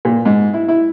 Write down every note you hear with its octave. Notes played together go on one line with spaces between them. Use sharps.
A#2
G#2
E4
E4